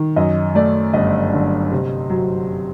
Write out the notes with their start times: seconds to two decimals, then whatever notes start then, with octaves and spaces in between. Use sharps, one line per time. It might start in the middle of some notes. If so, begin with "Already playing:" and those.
Already playing: D#3
0.16 F#2 D#5
0.55 A3 D5
0.94 G1 D#5
1.33 D3
1.72 C3
2.10 F#3